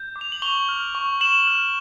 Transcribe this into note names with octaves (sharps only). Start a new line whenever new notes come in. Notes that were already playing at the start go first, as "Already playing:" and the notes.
Already playing: G6
D6
F7
F#7
C#6 F7 G7
F6
C#6
C#6 E7 F#7
F6